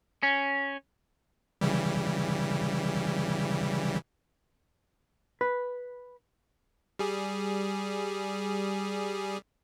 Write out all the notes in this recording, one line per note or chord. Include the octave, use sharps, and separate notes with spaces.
C#4
C#3 E3 G3
B4
G3 G#4